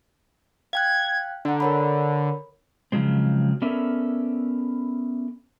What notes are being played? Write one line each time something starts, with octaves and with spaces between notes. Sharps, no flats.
F5 G5 F#6 G#6
D3 F#5 A#5
A#4 C#5 B5
C#3 F3 F#3 G#3 C4
B3 C#4 A4 A#4 D5 E5